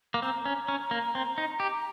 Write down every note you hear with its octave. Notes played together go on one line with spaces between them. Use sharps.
A#3
C4 A#5
C#4
C#4
A#3
C4
D#4
G4